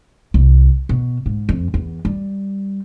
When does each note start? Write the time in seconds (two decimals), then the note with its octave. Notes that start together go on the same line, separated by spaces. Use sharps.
0.34 C2
0.89 B2
1.26 G#2
1.49 F2
1.74 E2
2.05 G3